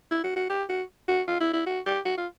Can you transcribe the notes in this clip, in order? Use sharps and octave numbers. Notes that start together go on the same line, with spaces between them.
E4
F#4
F#4
G4
F#4
F#4
F4
E4
E4
F#4
G4
F#4
F4